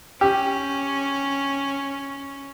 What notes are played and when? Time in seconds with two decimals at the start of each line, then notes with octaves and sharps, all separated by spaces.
0.21 C#4 G4